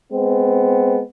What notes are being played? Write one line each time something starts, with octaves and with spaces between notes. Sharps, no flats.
G#3 B3 C4